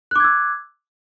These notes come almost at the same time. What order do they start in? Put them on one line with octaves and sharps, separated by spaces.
F#6 D6 G#6 E6